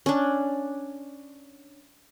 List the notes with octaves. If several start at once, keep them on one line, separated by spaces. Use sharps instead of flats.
C#4 D4